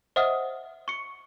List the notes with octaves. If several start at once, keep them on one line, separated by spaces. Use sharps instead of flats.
C5 D#5 E5 F#5 D#6 F6
C#6 C#7